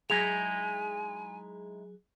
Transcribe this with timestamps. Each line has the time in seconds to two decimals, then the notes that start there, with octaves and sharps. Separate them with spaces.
0.10 F#3 G#3 D#4 E4 G#4 G#5 F7